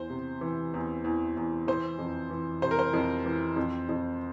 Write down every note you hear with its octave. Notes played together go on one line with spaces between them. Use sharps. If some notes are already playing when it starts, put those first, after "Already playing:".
Already playing: E2 C5
C3
E3
E2
E2
E2
E3 C5
F2
E3
C3 C5
A#4
C5
F2
E3
F2
F2